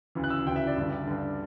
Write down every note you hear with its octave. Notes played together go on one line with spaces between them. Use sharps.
D2 C#3 E3
F#6
E6
D2 C#3 E3 G5
E5
D5
G2 D3
G2 D3